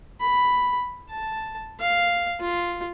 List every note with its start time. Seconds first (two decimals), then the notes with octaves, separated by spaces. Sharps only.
0.21 B5
1.10 A5
1.80 F5
2.41 F4